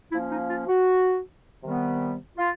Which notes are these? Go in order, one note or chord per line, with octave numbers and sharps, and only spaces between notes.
F3 A#3 C#4 E4
D#4
F4
F#4
C3 D#3 G3 B3
F4